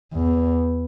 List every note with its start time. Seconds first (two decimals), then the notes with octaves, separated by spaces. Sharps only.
0.14 E2